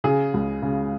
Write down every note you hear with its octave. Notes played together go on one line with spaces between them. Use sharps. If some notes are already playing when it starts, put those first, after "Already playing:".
C#3 G#4
C#2
C#3